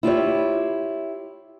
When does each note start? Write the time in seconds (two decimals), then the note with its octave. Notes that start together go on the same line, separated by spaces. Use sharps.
0.03 E4 F4 G4 C#5